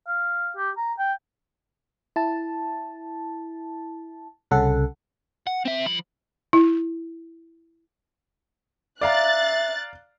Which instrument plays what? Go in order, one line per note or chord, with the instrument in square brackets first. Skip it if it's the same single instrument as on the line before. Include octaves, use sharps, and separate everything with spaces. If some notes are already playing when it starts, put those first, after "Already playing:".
[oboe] F5
G4
A#5
G5
[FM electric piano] E4 A5
C2 C#3 C#4 A4 F#5
[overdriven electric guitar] F#5
C4 E5
F3 B5
[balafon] E4
[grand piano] D5 F5 A#5 [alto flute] E5 [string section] F#6 A6